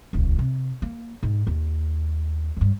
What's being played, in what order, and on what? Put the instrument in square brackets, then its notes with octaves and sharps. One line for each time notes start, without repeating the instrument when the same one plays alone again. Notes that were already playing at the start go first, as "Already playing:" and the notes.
[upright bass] D#1 C#2
C3
A#3
G#2
D#2
G2 F#3